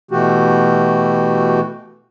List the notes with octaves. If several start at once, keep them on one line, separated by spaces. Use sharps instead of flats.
B2 E3 A3 F#4 G4